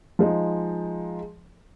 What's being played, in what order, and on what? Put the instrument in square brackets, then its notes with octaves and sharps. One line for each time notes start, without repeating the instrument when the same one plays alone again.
[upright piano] F3 G#3 D#4